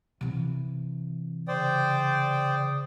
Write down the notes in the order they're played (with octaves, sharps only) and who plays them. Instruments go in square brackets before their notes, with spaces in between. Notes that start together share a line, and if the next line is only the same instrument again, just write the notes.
[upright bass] C3 E3
[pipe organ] C#3 D#6 [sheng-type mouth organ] C5 D5 G5